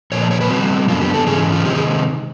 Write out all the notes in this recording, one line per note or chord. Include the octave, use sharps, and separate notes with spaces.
A#2 F3 C#5
D5
C#5
B4
B2 G3 C4 F#4
F#2 D3 F#3 B3 D4 F4
G4
A4
G#2 E3 G#3 C#4 G#4
F4
C3 D#3 G#3 C4 D#4 G4
G#4